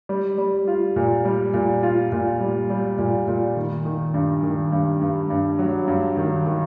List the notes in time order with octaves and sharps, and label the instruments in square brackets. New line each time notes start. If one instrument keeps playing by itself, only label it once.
[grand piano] G3
G3
F4
A#2
G3
A#2
F4
A#2
G3
G3
A#2
A#2
D#3
D#3
G2
D#3
G2
G2
G2
F#3
G2
D#3
D#3